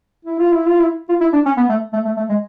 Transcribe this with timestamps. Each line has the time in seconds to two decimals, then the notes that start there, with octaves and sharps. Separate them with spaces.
0.25 E4
0.39 F4
0.53 E4
0.66 F4
0.80 E4
1.09 F4
1.21 E4
1.33 D4
1.45 C#4
1.57 B3
1.69 A3
1.93 A3
2.05 A3
2.17 A3
2.29 G#3